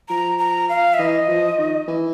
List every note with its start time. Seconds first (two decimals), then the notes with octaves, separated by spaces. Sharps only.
0.09 F3 A#5
0.38 A#5
0.69 F5
0.94 E5
0.99 E3 D#5
1.28 F3
1.58 D#3
1.88 E3